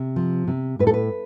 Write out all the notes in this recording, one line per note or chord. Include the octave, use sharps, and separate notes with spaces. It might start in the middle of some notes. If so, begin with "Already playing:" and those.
Already playing: C3
F3
C3
A2 B4
A4
B4